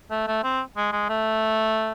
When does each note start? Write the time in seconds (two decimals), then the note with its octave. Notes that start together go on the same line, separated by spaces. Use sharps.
0.11 A3
0.27 A3
0.44 C4
0.77 G#3
0.92 G#3
1.10 A3